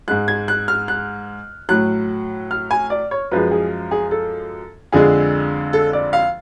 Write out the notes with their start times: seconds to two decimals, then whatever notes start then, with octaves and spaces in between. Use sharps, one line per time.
0.08 G#2 G#3 F#6
0.28 G#6
0.48 F#6
0.68 F6
0.88 F#6
1.69 A2 F#3 F#6
2.51 F6
2.71 G#5
2.90 D5
3.11 C#5
3.31 F#2 F3 G#3 B4
3.51 G#4
3.91 G#4
4.11 A4
4.92 F2 D3 G#3 G#4
5.73 A4
5.93 D5
6.13 F5